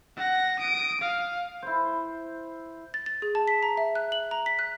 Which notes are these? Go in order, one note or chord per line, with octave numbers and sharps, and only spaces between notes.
F#5 A#6
D#6 D7
F5
E4 C5
A6
A6
G#4
A5
B6
A#5
E5
F#6
F#7
A#5
B6
F#6